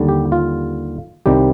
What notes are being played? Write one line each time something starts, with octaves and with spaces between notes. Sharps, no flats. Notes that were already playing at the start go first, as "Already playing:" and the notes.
Already playing: D#2 D3 G3
G4
F4
C2 C3 D#3 G3 C4 G4